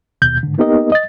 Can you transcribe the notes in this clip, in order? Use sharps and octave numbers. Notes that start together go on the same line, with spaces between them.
D#2 B2 G6
G#2 D3
A#3 B3 D#4 G4 A#4 D#5
D#5 A6